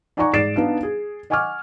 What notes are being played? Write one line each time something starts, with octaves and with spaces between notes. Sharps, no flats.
D#4 D5 F#5 G#5 A#5 C#6
G#2 D5 A6 C7 D7 E7
B3 D4 D#4 F5
G#4
D#5 F#5 G#5 C#6 D6 F6